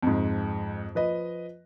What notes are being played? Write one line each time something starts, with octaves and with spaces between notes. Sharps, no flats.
F2 G#2
F3 B4 D#5